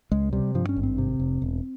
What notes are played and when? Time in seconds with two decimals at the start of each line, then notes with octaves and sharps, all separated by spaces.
0.11 C#2 G#3
0.33 C3 G3
0.54 G2 F3
0.69 C#4
0.77 G#1
0.83 C4
0.98 C3
1.20 F1
1.42 E1